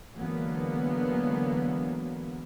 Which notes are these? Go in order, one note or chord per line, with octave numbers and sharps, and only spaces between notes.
D3 E3 F#3 G#3 A#3 B3